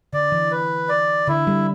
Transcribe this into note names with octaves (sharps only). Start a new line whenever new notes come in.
D3 D5
E3
B4
D5
D3 E4
G3